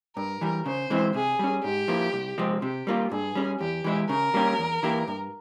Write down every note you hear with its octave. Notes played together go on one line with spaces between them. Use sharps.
G2 A#4
E3 G3
C#3 C5
E3 G#3 C4 E4
C3 G#4
G3 C#4
G#2 G4
F3 A#3 E4
C2
C3 F3 G#3 C4
C3 G4
G3 A#3 F4
G2 G#4
G3 C#4
E2 G4
E3 G#3 E4
C#3 A#4
G3 A#3 C#4 G4
E2
E3 A#3 E4 G4
G2